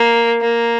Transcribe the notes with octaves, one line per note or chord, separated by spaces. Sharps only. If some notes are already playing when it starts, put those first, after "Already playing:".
Already playing: A#3
A#3